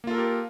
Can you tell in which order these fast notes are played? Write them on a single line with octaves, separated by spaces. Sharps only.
A#3 F4 A4 A#4 G4